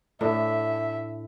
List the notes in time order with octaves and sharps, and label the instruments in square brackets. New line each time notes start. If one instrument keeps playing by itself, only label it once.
[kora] A2 D4 [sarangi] E5